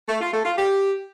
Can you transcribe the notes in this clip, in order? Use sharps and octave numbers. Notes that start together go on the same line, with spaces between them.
A3
F4
A3
F4
G4